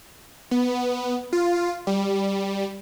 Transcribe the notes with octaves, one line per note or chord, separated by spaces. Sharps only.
B3
F4
G3